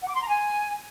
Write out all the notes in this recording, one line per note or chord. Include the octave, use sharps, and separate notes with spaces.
F#5
D6
C6
A#5
G#5